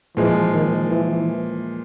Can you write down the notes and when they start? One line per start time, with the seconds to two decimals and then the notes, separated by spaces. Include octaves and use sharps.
0.16 A#2 E3 F3 G#3
0.52 D#3
0.89 E3